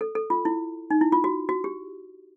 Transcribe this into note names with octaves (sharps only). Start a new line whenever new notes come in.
A4
A4
F4
E4
D#4
E4
F4
F#4
F#4
G4